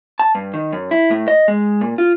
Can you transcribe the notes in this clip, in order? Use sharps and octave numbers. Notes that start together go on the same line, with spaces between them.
A5
G2
D#3
F#2
E4
A2
D#5
G#3
A#2
F4